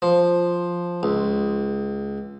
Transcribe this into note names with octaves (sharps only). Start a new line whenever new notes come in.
F3
C#2